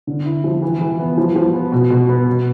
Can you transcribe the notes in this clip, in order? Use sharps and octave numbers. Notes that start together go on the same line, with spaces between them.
D3
E4
F3
E3
E3
B3
F3
F3
B3
B2
B2
B3
B2